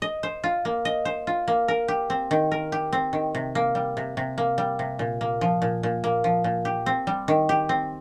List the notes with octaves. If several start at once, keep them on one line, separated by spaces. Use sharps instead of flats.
D#5
C5
F4
A#3
D#5
C5
F4
A#3
A#4
G4
C4
D#3
A#4
G4
C4
D#3
C3
A#3
G3
C3
C3
A#3
G3
C3
A#2
A#3
F3
A#2
A#2
A#3
F3
A#2
G4
C4
G3
D#3
G4
C4